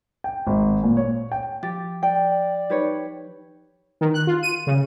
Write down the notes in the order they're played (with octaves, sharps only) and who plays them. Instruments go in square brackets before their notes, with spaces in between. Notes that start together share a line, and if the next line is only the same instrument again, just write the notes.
[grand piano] G5
G#1
A#2
C#5
G5
[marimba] F3 A6 [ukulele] G4
[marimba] F3 [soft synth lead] D5 [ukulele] G5
[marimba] D#4 G#6 [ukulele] G4 B4 C#5
[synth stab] D#3
F#6
F4
D#7
C#3